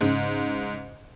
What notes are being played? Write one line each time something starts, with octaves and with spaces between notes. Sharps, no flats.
G#2 C#3